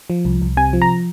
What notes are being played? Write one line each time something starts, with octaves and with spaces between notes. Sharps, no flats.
F3
C2
C2
C3 G#5
F3
A#5